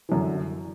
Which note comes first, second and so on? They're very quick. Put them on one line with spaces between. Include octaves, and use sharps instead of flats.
E3 F#2 D3